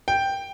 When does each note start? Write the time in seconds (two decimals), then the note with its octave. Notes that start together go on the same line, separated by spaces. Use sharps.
0.08 G5